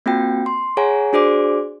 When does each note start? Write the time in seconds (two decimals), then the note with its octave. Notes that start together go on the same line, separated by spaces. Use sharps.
0.06 A#3 C4 F4 F#4 G5
0.46 C6
0.77 G#4 C#5 F#5 G#5 A#5
1.13 D4 F#4 G#4 C5 D5 D6